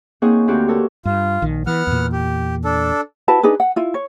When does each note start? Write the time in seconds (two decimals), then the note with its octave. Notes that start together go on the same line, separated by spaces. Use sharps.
0.22 A#3 C4 D#4 G#4 C#5 F#5
0.47 D2 C4 F#4 G4 F6
0.68 A4 A#4 C#5
1.05 G2 F4
1.42 A#1 D#3
1.67 E3 B3 F#5 F6
1.87 E2 A#2
2.12 G4
2.65 D4 A4
3.28 E4 F#4 B4 A5
3.43 D4 D#4 G#4 B4
3.60 F#5
3.76 E4 F4
3.94 C#5